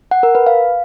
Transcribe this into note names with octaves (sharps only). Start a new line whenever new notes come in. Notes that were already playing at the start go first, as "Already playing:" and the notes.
F#5
A#4
B4
F5